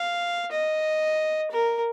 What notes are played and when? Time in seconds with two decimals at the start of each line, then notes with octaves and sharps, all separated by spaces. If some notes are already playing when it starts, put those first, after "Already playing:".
Already playing: F5
0.51 D#5
1.51 A#4